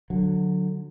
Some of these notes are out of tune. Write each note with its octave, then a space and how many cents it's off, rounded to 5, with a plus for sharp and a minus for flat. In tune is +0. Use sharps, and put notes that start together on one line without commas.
D3 +10 F#3 -10